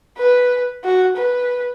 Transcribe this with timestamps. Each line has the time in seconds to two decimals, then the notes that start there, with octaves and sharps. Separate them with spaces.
0.18 B4
0.84 F#4
1.17 B4